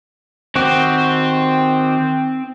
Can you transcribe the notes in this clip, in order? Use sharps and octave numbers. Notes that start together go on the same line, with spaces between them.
D#3 C4 F#4 G4